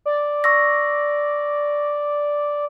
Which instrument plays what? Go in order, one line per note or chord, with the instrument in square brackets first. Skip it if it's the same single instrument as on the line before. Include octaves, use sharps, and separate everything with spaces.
[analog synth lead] D5
[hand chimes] C#6 E6 A#6